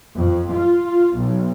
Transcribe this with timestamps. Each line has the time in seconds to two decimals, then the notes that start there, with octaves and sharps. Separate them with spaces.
0.16 F2
0.53 F4
1.17 B1